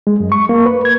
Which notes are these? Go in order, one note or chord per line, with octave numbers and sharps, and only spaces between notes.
G#3
F#2
C#6
A#3
B4
G#6